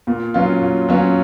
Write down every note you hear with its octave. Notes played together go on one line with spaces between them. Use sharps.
A#2
F#3 C#4 F4
A#2
F#3 C#4 F4